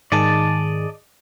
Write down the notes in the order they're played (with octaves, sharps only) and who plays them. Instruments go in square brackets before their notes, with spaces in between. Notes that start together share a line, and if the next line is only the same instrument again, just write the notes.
[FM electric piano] G#2 D#3 G#4 [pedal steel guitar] D5 D#5 A5